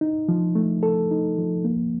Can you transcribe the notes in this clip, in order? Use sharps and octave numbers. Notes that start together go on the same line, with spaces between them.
D#4
F3
A3
A4
D#4
F3
A#3